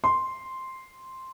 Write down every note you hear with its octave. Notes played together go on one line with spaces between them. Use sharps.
C6